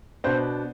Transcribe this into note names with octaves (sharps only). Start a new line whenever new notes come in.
B2 B3 D4 C5